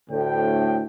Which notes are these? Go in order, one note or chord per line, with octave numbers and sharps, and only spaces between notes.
D2 A2 G5